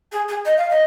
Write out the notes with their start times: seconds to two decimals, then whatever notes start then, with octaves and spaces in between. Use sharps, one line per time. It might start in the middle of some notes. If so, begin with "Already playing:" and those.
0.12 G#4
0.29 G#4
0.45 D#5
0.57 F5
0.70 D#5